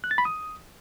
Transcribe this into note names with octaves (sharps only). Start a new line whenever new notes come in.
F#6
A6
B5
D#6